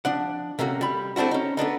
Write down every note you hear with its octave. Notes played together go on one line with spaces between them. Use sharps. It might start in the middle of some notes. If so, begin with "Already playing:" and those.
F3 D4 F#5
C3 A3 A#3 C#4 F#4
G3 B5
A3 C4 D4 E4 F#4
C#4 D#4
A3 B3 D4 D#4